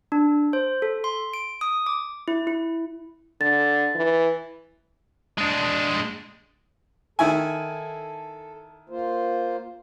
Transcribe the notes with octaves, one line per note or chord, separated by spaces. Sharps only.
D4
C5
A4
C6
D7
D#6
D6
E4
E4
D3 A6
E3
G#3 D4
D#3 E4 A4 G#5
A#3 F4 C5